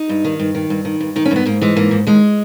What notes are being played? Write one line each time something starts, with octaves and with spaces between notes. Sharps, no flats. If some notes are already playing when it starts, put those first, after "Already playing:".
Already playing: D#4
G2
D#3
G2
D#3
G2
D#3
G2
D#3 D#4
C#4
G2 B3
G#2 A#3
E3 G#3
G#2 A#3
G#2
D#2 G#3